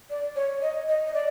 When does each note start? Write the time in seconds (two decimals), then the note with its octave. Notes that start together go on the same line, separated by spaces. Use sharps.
0.10 D5
0.36 C#5
0.62 D#5
0.88 D#5
1.06 D#5
1.14 D5